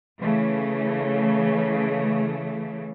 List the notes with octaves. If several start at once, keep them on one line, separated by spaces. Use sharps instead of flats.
C#3 E3 A3